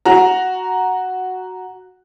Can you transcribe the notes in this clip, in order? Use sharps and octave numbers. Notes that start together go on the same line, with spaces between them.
F#4 A#5